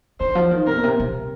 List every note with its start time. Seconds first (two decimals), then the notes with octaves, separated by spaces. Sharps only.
0.20 D3 C5
0.35 F3
0.51 D#3
0.67 C3 A#4
0.76 A#2
0.84 C3
1.00 C3